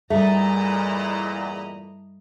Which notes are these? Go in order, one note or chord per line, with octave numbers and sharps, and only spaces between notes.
E2 G2 A#2 A3 E4 D#5 A#5